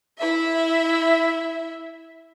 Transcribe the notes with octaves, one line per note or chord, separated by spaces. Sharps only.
E4 E5